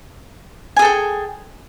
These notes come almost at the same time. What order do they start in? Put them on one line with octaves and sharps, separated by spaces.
G#5 G#4 A4 G5